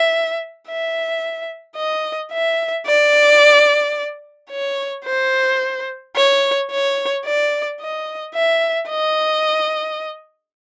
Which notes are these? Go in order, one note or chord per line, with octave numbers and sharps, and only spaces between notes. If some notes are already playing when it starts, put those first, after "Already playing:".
Already playing: E5
E5
D#5
E5
D5
C#5
C5
C#5
C#5
D5
D#5
E5
D#5